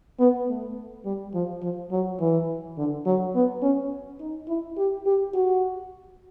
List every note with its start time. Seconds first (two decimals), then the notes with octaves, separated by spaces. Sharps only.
0.19 B3
0.48 A3
1.05 G3
1.34 F3
1.62 F3
1.91 F#3
2.20 E3
2.77 D3
3.06 F#3
3.35 B3
3.62 C#4
4.20 D#4
4.48 E4
4.78 G4
5.06 G4
5.34 F#4